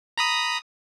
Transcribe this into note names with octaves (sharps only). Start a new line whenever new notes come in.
A#5 B5 D#6